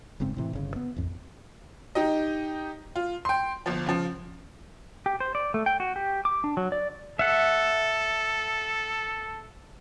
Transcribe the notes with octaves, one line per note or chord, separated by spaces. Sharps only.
F#1 G#2 C#3 C4
A2 C3 E3
G1 C#3
B3
A1 F2
D#4 G4 D#5
F4
G5 C6
G1 F3
C#3 F3
G4
C5
D5
A3
G5
F#4
G4
D6
D4
F#3
D5
A4 E5 F#5